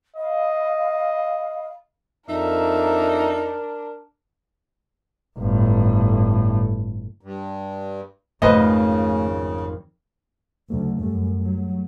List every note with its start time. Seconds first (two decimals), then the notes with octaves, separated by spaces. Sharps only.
0.16 D#5 F5 B5
2.29 F2 D4 D#4 A#4 E5
5.38 G1 A2
7.21 G2
8.42 G#1 F2 C#3 A3 B4 C5 D#5
10.70 D2 C#3 F#3 A3
11.01 F#2 G3 A3
11.44 F#3